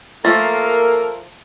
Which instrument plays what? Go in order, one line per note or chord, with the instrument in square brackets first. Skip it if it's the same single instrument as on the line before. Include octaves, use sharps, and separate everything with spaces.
[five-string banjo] F3 A3 [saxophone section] A#3 A#4 [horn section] A4 [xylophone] A6